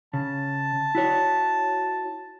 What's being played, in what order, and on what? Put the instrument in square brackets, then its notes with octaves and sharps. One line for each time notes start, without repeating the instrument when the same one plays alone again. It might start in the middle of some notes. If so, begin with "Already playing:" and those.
[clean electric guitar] C#3 [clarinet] A5
[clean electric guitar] E4 F#4 C#5